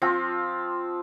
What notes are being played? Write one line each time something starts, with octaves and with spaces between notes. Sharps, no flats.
F3 C4 F4